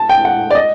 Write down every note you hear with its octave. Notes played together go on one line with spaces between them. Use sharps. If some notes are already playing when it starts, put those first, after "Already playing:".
Already playing: A5
G5
F#5
D5
D#5